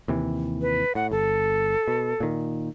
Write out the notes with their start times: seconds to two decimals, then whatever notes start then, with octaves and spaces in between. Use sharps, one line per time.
0.08 D#2 C3 E3
0.61 B4
0.95 A2 F#5
1.11 G1 A4
1.88 B2
2.20 A#2 D#3